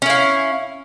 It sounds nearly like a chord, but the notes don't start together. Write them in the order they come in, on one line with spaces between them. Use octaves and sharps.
C#4 E4 F5